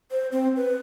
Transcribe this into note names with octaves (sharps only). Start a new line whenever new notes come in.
C5
C4
B4